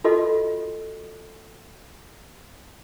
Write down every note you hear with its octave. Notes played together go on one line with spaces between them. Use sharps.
F4 F#4 A4 D#5